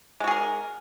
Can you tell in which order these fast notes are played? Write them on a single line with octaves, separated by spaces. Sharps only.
G#3 F#4 G#4 A#4